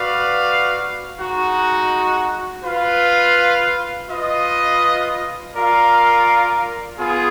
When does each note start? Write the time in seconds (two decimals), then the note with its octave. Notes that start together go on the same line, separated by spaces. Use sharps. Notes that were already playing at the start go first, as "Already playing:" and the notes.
Already playing: F#4 B4 D5 F5
1.16 G#3 D#4 F#4
2.62 F4 B4 F5
4.08 F4 B4 D#5
5.54 F4 A#4 D5 F5
6.99 B3 F4 G#4